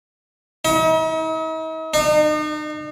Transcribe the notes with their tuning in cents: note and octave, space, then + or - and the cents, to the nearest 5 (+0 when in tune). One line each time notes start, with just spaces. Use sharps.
D#4 +45
D#4 -40